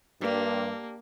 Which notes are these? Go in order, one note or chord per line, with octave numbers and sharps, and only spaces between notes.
G2 A#3 D4 G4